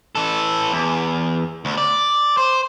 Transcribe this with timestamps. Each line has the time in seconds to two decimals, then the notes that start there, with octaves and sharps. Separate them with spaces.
0.15 E3 A4
0.73 E2
1.65 D2
1.78 D5
2.37 C5